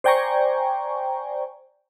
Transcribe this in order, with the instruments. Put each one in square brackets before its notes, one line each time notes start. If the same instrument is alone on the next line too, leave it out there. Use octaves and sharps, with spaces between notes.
[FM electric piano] C5 D5 G5 G#5 A#5 C#6